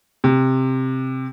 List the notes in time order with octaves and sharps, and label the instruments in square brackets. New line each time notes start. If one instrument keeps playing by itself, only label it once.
[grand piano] C3